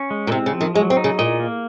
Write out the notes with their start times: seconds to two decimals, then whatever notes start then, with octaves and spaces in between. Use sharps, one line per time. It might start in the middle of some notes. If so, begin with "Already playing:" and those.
Already playing: C#4
0.11 G#3
0.27 A#2
0.31 C3 C4
0.46 C#3
0.53 F3
0.61 D#3
0.75 F#3 G#3
0.90 C4
0.97 D#4
1.04 C#3
1.19 A#2 D#5
1.40 A#3